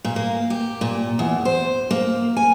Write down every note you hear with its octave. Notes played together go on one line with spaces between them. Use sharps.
A#2
A#3
G4
A#2
E2
C5
A#3
G#5